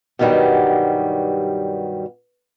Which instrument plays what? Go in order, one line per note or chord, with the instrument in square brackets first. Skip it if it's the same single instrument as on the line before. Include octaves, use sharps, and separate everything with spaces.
[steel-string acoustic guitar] G2 B2 D#3 F#3 G3